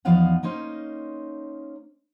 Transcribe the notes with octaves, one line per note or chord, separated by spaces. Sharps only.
E2 F3 D#4 F4 F5 F#5
A#3 C#4 D#4 C5